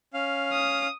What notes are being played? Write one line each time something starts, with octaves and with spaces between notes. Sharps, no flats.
C#4 F5
D#6